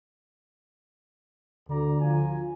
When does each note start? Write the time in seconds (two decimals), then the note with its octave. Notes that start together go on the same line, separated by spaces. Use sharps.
1.69 D2 D3 D5 A#5
2.00 F3 F4 G#5